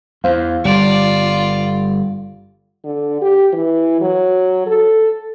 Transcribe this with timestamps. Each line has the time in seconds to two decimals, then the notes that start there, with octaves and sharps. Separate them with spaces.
0.24 E2 C5 F5
0.65 G1 G3 F4 D5
2.84 D3
3.22 G4
3.53 E3
4.01 F#3
4.66 A4